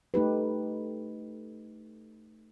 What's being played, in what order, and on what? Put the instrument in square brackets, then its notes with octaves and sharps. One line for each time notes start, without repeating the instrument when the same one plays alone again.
[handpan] A3 D#4 G4 B4